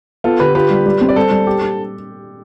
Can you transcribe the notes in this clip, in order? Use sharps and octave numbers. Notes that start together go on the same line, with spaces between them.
B3 F4 A4
D3 G4 B4
F4 G4 B4
G3
G3
C4
D5
G3 A4 C5
G3
G4
G4